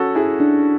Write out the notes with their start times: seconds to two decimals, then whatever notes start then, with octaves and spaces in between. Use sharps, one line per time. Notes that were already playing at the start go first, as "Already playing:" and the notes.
Already playing: C#4 F#4 A4
0.15 E4 G#4 E5
0.40 D4